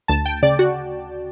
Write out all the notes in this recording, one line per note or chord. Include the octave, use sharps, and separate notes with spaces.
D2 A5
G5
C#3 D5
F#4